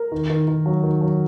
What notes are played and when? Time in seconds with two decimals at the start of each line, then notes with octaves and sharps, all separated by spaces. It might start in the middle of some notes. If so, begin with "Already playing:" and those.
Already playing: A#4
0.12 D#3
0.30 D#3
0.48 D#3
0.66 F#3
0.83 D#3
1.02 F#3